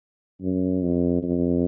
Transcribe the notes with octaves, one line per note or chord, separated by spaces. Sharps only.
F#2
F2
F2